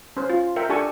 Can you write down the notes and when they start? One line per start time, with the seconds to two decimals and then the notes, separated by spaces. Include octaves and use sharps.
0.17 C#4 C5
0.30 F4
0.56 A#4 E5 G5
0.69 D4 G4 A4 G#5 A5 C#6